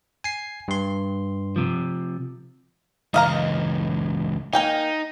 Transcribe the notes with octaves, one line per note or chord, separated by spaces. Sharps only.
G#5 C7
G2 C6
C3 F3
C#2 E3 D#5 F5 A#5
A#3 D#4 G5 G#5